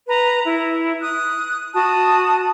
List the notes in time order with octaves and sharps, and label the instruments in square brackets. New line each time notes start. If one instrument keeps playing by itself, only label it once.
[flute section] B4 A#5
E4
D#6 F#6
F#4 A5 D#6